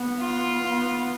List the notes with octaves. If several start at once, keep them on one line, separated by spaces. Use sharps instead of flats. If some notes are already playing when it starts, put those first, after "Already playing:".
Already playing: B3
F4
B3